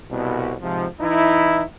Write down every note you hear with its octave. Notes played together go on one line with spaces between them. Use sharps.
C2 B2
G#2 C3 F3
E3 D#4 E4